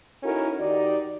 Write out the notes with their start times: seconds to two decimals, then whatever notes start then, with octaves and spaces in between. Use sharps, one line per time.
0.23 C#4 D#4 E4 F#4 A4 A#4
0.60 D#3 D#4 F#4 G4 D5